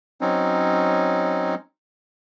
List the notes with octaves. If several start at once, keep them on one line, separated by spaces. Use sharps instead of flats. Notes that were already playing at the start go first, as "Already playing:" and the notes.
F#3 C4 C#4 D#4